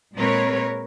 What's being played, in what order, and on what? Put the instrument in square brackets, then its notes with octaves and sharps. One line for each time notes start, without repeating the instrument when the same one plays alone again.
[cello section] A#2 G#3 C4 A#4 B4 C#5